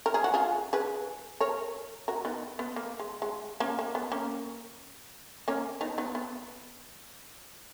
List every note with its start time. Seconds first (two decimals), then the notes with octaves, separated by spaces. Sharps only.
0.06 A#4
0.14 G#4
0.24 F#4
0.34 F4 G#4
0.73 G#4 B4
1.41 A#4 C#5
2.08 F#4 A#4
2.25 B3 D#4
2.59 B3
2.76 A#3
3.00 G#3
3.22 G#3
3.60 A#3 C#4
3.79 A#3
3.95 B3
4.12 A#3 C#4
5.48 A#3 C#4
5.81 B3 D#4
5.98 B3 D#4
6.15 B3